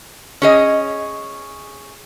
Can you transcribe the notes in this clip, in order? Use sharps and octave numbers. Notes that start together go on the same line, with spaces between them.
C#4 G#4 D#5